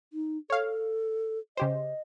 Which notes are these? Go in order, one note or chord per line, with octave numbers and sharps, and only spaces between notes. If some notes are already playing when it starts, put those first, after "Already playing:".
D#4
A4 C#5 F5
C#3 G4 C5 D#5